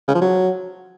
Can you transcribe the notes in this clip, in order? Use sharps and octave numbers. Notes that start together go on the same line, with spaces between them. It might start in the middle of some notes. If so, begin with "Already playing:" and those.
C#3
F3
F#3